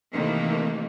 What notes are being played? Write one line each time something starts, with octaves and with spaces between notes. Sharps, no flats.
C3 D#3 E3 A3 A#3